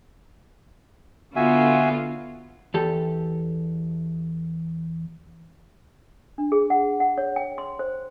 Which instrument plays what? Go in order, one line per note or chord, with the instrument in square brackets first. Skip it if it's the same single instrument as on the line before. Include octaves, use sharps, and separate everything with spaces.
[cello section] D3 B3 F4 [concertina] F#4 E5 G#5
[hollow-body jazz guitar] E2 G4 A4
[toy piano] D4
G#4
F#5
F#5
C#5
G5
C6
C5